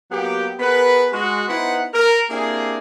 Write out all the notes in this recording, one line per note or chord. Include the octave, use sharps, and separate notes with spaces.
F#3 A#3 B3 G4
B3 G#4 A#4 B4
G#3 F#4
B3 D#4 E4 B4 C5 F#5
A#4
A#3 C4 D4 E4 G4 G#4